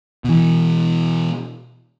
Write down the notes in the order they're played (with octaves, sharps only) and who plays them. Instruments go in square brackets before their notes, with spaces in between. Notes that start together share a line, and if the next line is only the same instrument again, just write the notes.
[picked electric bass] B2 E3